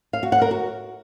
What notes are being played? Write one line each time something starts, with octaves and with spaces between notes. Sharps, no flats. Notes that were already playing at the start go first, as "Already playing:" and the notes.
F5
F#4
F#5
A#4
F#4